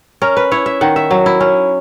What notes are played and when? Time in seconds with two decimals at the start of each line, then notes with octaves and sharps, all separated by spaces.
0.22 C#4 A#4
0.37 B4
0.51 E4 C#5
0.66 E5
0.81 D#3 F#5
0.96 E5
1.11 F#3
1.26 E4
1.41 C#4